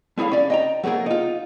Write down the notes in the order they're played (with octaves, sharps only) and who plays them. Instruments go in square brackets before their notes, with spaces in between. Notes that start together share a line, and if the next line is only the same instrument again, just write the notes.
[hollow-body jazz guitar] A3 E4 G#4 C#5 F5
C#4 D5
D#5 G5 A#5
F#3 A3 A#3 G#4 A#4
D#4 F4